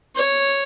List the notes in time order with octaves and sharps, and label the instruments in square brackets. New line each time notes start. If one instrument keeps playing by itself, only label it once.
[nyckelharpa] C#5